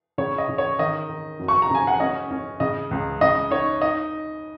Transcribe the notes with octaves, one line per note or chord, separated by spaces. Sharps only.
C#3 C#5
D#5
C#3
C#5
D#3 D#5
D#3
F#2
C#6
A#5
C#3 G#5
F#5
C#4 D#5
C#4
C#3 D#5
C#2
C#3 D#5
D#4 C#5
D#4 D#5